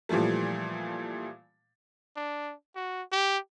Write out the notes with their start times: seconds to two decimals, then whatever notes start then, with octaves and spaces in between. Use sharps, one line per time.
0.09 A#2 E3 F3 G3 A3
2.16 D4
2.75 F#4
3.12 G4